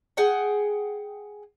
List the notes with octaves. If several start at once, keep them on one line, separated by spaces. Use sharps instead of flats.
G#4 F#5 G5